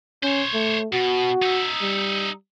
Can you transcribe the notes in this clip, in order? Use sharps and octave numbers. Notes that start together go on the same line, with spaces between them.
C#4 C5 C#5
A3
B2 F#4
D#4 E5
G3